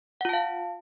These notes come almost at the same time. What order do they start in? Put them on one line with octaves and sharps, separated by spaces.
F#5 F4 A5 F5